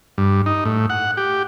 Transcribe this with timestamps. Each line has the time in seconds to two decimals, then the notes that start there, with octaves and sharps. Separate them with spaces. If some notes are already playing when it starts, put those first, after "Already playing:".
0.18 G2
0.46 D#4
0.65 A2
0.90 F#5
1.17 G4